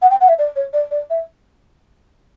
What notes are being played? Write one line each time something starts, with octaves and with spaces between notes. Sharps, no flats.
F#5
G5
F#5
E5
D5
C#5
D5
D5
E5